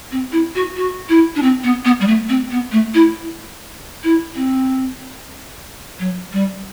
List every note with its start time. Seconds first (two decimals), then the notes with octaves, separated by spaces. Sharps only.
0.11 C4
0.32 E4
0.55 F#4
0.76 F#4
1.09 E4
1.35 D4
1.42 C4
1.63 B3
1.85 B3
2.00 G3
2.07 A3
2.29 C4
2.51 B3
2.72 A3
2.94 E4
4.04 E4
4.35 C4
5.99 F#3
6.32 G3